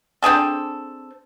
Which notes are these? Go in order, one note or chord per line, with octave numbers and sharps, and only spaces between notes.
C4 D4 G#4 A4